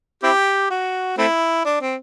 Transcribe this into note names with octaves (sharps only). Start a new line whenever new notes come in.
C4 E4 G4
F#4
A3 C4 E4
D4
C4